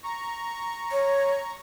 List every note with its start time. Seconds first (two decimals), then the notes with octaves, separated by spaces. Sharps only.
0.04 A#5 C#6
0.91 C#5